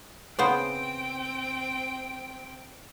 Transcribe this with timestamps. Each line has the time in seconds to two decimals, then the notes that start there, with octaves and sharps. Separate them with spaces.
0.39 C#3 B3 C4 C5 G5